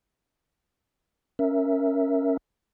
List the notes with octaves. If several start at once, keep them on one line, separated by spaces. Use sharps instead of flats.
C#4 A#4 E5